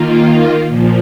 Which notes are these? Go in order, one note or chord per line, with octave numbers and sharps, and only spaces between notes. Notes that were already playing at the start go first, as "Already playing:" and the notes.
Already playing: D#3 A#3 F4
A#2 F3